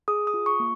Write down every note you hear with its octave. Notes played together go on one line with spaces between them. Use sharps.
G#4 D#6
D#6
F4
C#6
A#3